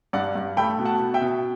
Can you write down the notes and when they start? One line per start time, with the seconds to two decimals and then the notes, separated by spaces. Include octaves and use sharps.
0.13 G2 D5 F#5
0.35 G2
0.57 A3 G5 B5
0.78 B2
0.85 F#5 A5
0.99 B2
1.14 E5 G5
1.21 B2